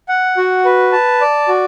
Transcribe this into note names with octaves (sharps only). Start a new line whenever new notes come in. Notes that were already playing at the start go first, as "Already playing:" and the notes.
F#5
F#4
B4
A5
D5
F#4